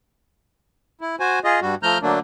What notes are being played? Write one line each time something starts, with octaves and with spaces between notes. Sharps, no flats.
E4
F#4 C5 G#5
F4 G#4 D#5
G2 G3 F#4
F3 A3 A#5 F6 G6
D3 F#3 A3 A#3 D4